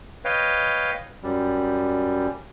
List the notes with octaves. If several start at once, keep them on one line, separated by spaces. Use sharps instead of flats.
B4 C#5 D#5 F5 G5
F#2 G3